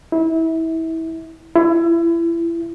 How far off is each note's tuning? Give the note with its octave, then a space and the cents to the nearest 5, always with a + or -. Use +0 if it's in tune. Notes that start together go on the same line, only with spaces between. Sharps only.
E4 -25
E4 +30